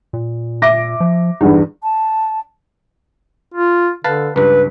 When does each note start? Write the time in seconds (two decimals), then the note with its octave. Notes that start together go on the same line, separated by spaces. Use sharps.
0.13 A#2
0.62 E5 D6 A#6
1.00 F3
1.41 E2 G2 D#4
1.83 A5
3.54 F4
4.04 D3 B4 F5 A5
4.36 C#2 G2 B4